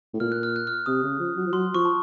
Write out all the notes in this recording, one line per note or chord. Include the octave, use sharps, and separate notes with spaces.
A2
A#2 F6
F#6
F6
F#6
F6
C3 D#6
C#3
F3
F#3
F3
F#3 C6
F3 C#6
A5